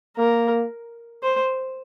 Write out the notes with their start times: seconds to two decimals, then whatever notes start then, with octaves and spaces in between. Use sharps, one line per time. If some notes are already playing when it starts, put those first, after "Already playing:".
0.18 A#3 A#4
1.23 C5